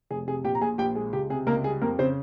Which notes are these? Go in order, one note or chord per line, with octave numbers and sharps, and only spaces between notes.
F1 G#4
C3 G#4
A#1 G4 G5
A#5
A#2 G#4 G#5
A#1 G4 G5
G#3 G#4
C#2 G4
C3 G#4
C#2 A#3 A#4
G3 G#4
F2 A#3 A#4
C#3 C4 C5